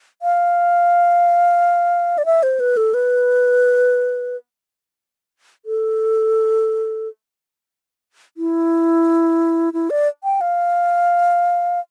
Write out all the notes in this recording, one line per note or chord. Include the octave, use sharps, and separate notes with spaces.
F5
D5
E5
C5
B4
A4
B4
A4
E4
E4
D5
G5
F5